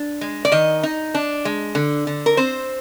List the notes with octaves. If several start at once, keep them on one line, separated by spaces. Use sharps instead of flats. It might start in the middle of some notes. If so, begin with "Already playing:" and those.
Already playing: D4
G#3
D5
D#3 D#5
D#4
D4
G#3
D3
D3
A#4
C4 C5